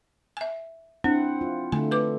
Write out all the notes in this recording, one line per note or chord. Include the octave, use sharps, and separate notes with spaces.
E5 G#5
C4 D4 E4 F#5
F4
D3 A3 G#5
B4 D6